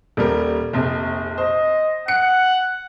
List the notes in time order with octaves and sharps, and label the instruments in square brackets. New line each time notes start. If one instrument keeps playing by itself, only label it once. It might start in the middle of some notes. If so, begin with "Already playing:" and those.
[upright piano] D#1 G3 A#4
F1 A#1 C3
[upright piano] C5 [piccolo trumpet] D#5
[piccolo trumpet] F#5 [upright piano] C#7